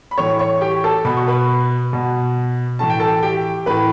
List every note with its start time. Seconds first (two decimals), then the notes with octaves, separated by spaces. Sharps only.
0.11 B5
0.18 A2 E3 C#5 C#6
0.39 C#5 C#6
0.61 G4 G5
0.84 A4 A5
1.05 B2 B5
1.17 C#6
1.27 B4 B5
1.93 B2
2.79 A2 E3 A5
2.90 G5
3.00 A4 A5
3.23 G4 G5
3.66 A2 E3 B4 B5